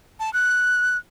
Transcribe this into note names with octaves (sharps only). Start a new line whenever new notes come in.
A5
F#6